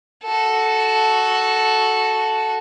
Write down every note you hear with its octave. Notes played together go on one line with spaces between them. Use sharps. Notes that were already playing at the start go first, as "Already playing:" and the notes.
F#4 A4